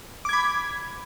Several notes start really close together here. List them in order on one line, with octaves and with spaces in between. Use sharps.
D6 G#6 B5